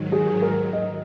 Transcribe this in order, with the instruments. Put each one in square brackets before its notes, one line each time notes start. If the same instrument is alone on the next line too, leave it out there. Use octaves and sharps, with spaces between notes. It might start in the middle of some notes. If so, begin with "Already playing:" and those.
Already playing: [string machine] G#2 D#3 F#3
[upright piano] G#4
A#4
D#5